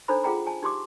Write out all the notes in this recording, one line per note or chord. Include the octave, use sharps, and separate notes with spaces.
D4 D#4 A4 C5 A#5 B5
F4 G#4 F#5 G5 A#5 B5
G#5 A5
D#4 G4 C6 D6